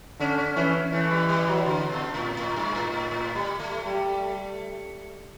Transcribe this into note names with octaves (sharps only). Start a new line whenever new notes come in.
D3 C#4
C#4
E3 C#4
E3 A3
G3
G3
F#3
D3
B2
A2
A2
G2
A2
A2
A2
G3
A3
G3